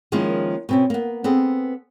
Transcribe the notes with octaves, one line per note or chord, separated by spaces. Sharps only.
D#3 F3 G#3 A#3 C#4 E4
B2 C4 C#4
A#3 B3
B3 C4 G#4 A4